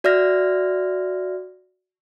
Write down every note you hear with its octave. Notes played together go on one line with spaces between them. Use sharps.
F#4 D5 E5 F6 A#6